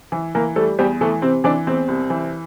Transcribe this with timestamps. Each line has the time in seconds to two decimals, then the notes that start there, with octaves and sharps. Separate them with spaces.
0.12 E3
0.35 E3 A#3 A#4
0.56 G3 A3 A4
0.79 E2 G3 G4
1.01 E3 A3 A4
1.22 C3 C4 C5
1.44 E3 D4 D5
1.67 E2 C4 C5
1.88 C2
2.10 E3